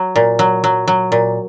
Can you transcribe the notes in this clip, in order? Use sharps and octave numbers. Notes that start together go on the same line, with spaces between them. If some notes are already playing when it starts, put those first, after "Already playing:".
Already playing: F#3
A#2
F#3
F#3
F#3
A#2